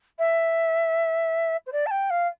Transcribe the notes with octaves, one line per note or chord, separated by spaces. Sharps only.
E5
C5
D5
A5
G5
F5